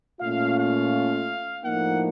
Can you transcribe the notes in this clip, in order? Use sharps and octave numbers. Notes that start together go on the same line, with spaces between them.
A#2 A3 C#4 F4 F5
F5
A2 F3 A#3 D#4 F#5